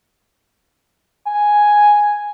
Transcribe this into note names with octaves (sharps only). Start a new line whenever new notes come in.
G#5